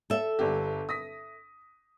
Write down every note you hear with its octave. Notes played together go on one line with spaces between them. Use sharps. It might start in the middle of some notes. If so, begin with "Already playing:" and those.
A4 E5
G1 D4 G4
D#6 A#6 B6